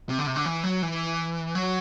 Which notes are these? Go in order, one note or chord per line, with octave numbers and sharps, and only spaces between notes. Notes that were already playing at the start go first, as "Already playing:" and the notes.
C3
D3
C3
D3
E3
F#3
E3
F#3